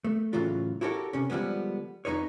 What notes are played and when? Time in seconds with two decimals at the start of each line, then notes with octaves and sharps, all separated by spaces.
0.04 A3
0.33 A2 C#3 E3 F#3 F4
0.81 E4 F#4 G4 A4 A#4 C#5
1.13 C3 C#4
1.30 D3 F3 G3 G#3 B3
2.05 F2 B2 D#4 B4 C#5